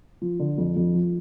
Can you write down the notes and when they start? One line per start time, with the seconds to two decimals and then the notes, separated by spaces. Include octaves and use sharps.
0.22 F3
0.39 D3
0.58 F2
0.76 F2
0.94 F3